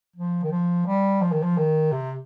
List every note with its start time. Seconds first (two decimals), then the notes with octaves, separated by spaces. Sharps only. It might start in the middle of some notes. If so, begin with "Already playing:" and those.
0.16 F3
0.43 D#3
0.51 F3
0.86 G3
1.21 F3
1.32 D#3
1.43 F3
1.58 D#3
1.92 C3